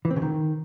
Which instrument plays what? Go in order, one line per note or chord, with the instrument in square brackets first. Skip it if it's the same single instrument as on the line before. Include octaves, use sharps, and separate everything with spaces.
[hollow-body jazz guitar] E3
C4
C#3
D#3